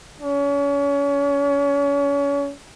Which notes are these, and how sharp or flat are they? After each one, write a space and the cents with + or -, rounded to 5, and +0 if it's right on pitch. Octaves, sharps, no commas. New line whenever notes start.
C#4 +35